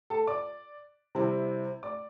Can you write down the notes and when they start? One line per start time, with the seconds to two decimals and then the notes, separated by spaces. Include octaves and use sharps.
0.10 A4 A5
0.27 D5 D6
1.15 C3 G3 C4 E4
1.83 D5 D6